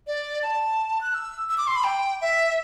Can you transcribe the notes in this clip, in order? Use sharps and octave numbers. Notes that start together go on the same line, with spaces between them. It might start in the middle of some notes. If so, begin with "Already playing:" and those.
D5
A5
F#6
E6
E6
D6
C6
B5
G5
E5